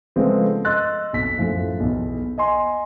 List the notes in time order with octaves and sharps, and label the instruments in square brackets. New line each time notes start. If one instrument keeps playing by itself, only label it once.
[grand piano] C#3 F3 G#3 A3 B3 C4
D#5 C6 E6 F#6 A6
B1 F2 B6
F#2 A2 F3
B1 E2
D#5 G#5 C6